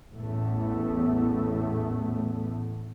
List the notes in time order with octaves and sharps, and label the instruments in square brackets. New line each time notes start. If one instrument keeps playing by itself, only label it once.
[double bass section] A1 E2 A2 A3 B3